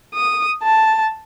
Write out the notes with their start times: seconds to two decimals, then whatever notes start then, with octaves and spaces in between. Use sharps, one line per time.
0.14 D#6
0.63 A5